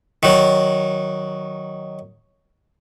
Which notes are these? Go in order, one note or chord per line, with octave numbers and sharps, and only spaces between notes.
D#3 F#3